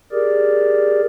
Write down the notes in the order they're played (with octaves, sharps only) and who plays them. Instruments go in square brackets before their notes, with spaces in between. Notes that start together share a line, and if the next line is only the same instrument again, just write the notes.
[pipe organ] G4 G#4 A#4 D5